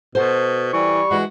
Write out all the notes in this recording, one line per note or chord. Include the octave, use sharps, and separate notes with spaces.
B2 F#4 A4 C5
E3 G3 C#6
E3 G#3 F#4